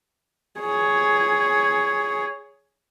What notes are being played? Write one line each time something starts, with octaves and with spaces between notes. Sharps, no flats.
G#4 C#5